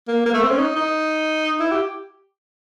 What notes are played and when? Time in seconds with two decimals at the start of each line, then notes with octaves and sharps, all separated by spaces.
0.08 A#3
0.26 A#3
0.34 A3
0.43 C4
0.51 C#4
0.59 D#4
0.76 D#4
1.60 E4
1.72 G4